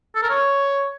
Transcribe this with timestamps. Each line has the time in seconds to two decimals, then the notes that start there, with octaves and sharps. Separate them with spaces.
0.15 A4
0.22 A#4
0.30 C#5